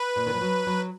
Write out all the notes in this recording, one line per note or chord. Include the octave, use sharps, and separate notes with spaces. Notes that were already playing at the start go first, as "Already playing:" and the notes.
Already playing: B4
A#2
D#3
F3
F#3
F#3